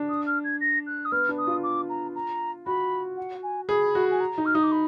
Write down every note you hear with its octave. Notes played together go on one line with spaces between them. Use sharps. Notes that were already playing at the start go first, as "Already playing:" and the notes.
Already playing: D4
D#6
F6
G#6
A#6
F#6
D#6
B3 F6
D4
D#6
F4
D6
A#5
A#5
F#4 B5
F#5
G#5
G#4 B5
F#4
G#5
A#5
D#4
F6
D#4 D#6
D6
B5